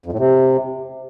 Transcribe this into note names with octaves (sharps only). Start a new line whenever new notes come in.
F2
A2
C3